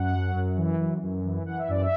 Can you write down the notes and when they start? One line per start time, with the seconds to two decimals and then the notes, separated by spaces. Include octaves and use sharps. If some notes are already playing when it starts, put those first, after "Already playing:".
Already playing: F#2 F#5
0.14 F#3
0.35 F#2
0.57 E3
0.79 F#2
1.02 F#2
1.24 E3
1.46 E3 F#5
1.59 E5
1.68 F#2 D5
1.81 E5